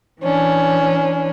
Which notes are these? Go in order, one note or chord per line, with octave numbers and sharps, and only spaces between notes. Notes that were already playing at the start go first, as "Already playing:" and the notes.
E3 C#4 D4